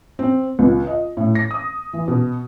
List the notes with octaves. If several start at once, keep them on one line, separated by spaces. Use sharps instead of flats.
C4
C#2
D#5
A2
A#6
D#6
E3
B2